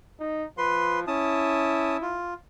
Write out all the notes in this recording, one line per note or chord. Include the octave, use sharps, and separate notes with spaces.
D#4
F3 B4 C6
C#4 E4 A5 D#6
F4